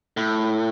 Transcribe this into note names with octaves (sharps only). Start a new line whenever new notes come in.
A2